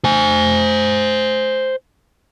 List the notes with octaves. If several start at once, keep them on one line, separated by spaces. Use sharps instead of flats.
C5 G#5